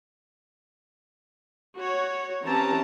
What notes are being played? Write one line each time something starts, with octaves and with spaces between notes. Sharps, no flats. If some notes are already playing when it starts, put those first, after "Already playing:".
F#4 C#5
E3 C4 C#4 G4 A5 A#5